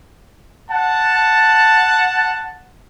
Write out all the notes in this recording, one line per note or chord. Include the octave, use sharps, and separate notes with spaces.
F#5 A5